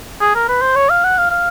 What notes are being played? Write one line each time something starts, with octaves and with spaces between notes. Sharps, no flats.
G#4
A#4
B4
C5
C#5
F5
F#5
F5
F5